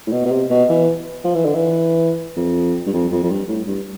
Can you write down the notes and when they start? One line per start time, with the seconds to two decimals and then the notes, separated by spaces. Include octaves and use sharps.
0.07 A2
0.12 B2
0.26 B2
0.31 C3
0.50 B2
0.69 E3
1.24 F3
1.35 E3
1.45 D3
1.55 E3
2.37 F2
2.86 G2
2.94 F2
3.12 F2
3.23 F2
3.30 G2
3.48 A2
3.67 G2